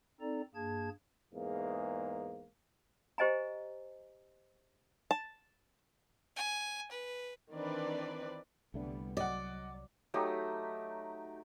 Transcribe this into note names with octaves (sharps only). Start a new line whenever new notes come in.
C4 D#4 A4 D5 A#5
G2 A#3 G#4 A5 G#6
E2 G#2 A#3
G4 C5 D#5 G#5 A#5
A5
G#5
B4
D#3 E3 C4 D4 B4 D5
C2 D3 G3 A3 B3 D4
F#3 D5 D#5 F#5
F#3 A3 D#4 G4